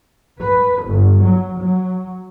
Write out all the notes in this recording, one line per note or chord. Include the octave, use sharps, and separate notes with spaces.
B4
G1
F#3
F#3